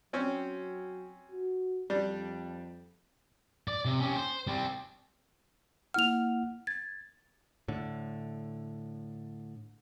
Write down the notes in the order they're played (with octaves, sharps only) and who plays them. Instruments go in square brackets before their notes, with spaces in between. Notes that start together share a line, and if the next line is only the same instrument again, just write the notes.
[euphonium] F#3 [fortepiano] C4 C#4
[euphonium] F#4
[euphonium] F2 [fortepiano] G3 D4
[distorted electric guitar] D5
C3
C#4 G4
C5
G3 C4
[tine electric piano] A#3 E4 F#5 [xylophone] F6 F7
[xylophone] G#6 [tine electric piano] A6
[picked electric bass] A2 D3